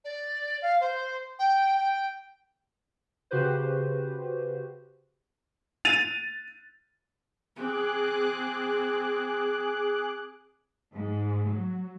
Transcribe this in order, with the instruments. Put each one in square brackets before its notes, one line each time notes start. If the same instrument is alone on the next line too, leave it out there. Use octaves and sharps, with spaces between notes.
[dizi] D5
F5
C5
G5
G5
[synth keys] C#3 F#4 G4 B4 C5
[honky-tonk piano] A6 D#7 F7
[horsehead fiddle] C4 [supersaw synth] G#4 D6 F#6
[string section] G#2
F#3